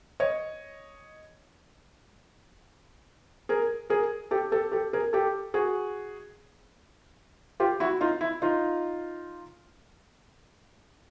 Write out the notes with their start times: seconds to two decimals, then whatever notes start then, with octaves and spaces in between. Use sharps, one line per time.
0.20 C#5 D#5
3.49 G#4 A#4
3.90 G#4 A#4
4.31 G4 A4
4.52 G4 A4
4.72 G4 A4
4.93 G#4 A#4
5.13 G4 A4
5.54 F#4 G#4
7.60 F4 G4
7.80 E4 F#4
8.01 D#4 F4
8.21 E4
8.42 D#4 F4